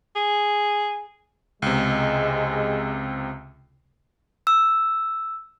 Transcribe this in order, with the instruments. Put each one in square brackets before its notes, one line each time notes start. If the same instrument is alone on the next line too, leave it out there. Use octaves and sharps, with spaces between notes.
[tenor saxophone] G#4
[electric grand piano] C#2 C3 [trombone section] G#3
[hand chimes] E6